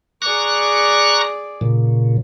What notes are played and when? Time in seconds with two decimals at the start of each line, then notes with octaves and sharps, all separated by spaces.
0.22 G#4 D5 A#5 C#6 F#6
1.61 A#2 C#3